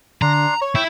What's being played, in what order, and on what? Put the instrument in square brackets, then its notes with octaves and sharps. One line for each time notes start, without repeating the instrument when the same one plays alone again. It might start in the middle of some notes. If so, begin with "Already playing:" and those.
[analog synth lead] D3 [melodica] D4 C6 [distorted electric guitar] A#5
[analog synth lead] C#5
[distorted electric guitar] E4 [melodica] G5